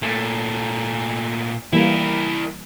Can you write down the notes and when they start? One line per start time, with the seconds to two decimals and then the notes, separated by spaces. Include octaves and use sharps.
0.02 A#2 A3
1.73 E3 G3 A#3 E4 A#4